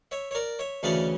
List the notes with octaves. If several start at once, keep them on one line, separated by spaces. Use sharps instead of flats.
C#5 E5
C#5
A#4 D5
C#5 E5
D2 C#3 E3 A3 C#4 D5 F5